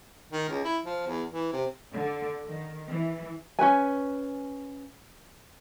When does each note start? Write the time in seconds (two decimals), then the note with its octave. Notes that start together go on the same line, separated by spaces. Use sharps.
0.32 D#3
0.49 C#2
0.65 E4
0.85 F3
1.07 E2
1.31 E3
1.53 C3
1.92 D3
2.47 D#3
2.89 E3
3.59 C#4 F#4 B4 G#5